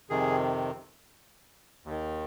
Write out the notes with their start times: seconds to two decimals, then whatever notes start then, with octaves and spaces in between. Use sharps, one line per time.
0.10 F2 C3 D#3 G#4
1.85 D#2 D#3